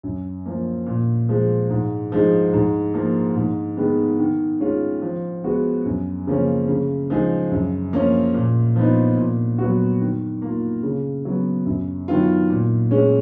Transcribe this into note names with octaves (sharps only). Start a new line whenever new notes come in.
F#2
F3 A#3
A#2
F3 G#3
G#2
F3 G#3 D#4
G#2
F3 A#3
G#2
D#3 G#3 B3
D#3
G#3 C#4 F4
F3
G#3 B3 F#4
F#2
C#3 F3 A#3 C#4
C#3
F3 G#3 D#4 G#4
F#2
F3 A#3 C#4
A#2
F3 B3 D#4
A#2
F#3 B3 F#4
D#3
A#3 F4
C#3
F#3 B3
F#2
D#3 F#3 B3 F4
A#2
G#3 C#4